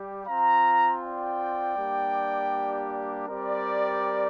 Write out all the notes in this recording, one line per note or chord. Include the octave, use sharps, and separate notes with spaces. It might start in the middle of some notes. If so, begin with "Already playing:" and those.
Already playing: G3 G4
C4 F4 F5 A#5
D5 G5
G3 A#3 D4 G4
G3 C4 G4 A#4 D5